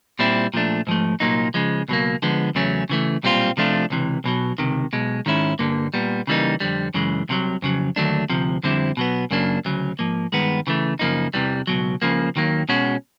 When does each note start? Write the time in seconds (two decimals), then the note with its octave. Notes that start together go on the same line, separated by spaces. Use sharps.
0.19 A#2 G3 C4 E4
0.54 A#2 F3 A3 D4
0.87 G#2 F3 A3
1.20 C2 A#2 F#3 A#3 D#4
1.54 C#3 F3 G#3
1.88 C#2 B2 F#3 A#3
2.22 D3 F3 G#3 B3
2.55 E2 C#3 F#3 A3 C#4
2.89 C#3 E3 A3
3.23 B1 A#2 G3 C4 F4
3.57 C3 F3 A3 D4 F4
3.90 C#2 C3 E3
4.24 B1 B2 F#3
4.58 C#2 C3 D#3
4.93 B1 B2 G#3
5.26 G#2 D#3 G#3 C#4 E4
5.59 G2 D3 G3 A#3
5.94 A#2 G3 B3
6.27 C#3 E3 G3 A#3 D#4
6.60 F2 D3 G3
6.94 F#2 C#3 E3 G#3
7.29 C2 C3 D#3 F#3
7.62 F2 C#3 F#3
7.96 D#2 D3 F#3 A3 D4
8.30 D2 C3 F3
8.63 F2 D3 G3 C4 E4
8.97 B2 F#3 B3
9.31 F#2 C#3 F#3 A#3 D4
9.65 D2 C#3 F#3
9.99 G#2 F3 A#3
10.32 G2 D#3 G#3 B3
10.67 C#3 E3 A3
10.99 F#2 C#3 F3 A#3 D#4
11.34 E2 C3 E3 G3
11.67 C#2 B2 F#3
12.02 C#2 C#3 F3 A#3
12.36 D#2 D#3 F#3 A#3
12.69 B2 G#3 C#4 F#4